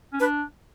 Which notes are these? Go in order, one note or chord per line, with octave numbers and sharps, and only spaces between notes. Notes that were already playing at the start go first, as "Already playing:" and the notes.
C#4
D4 B4